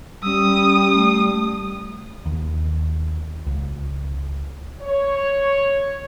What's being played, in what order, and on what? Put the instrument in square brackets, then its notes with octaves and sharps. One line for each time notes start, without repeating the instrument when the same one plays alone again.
[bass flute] G3 [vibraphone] C#4 E6 [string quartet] D#6
[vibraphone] A3
[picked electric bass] D#2
C#2
[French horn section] C#5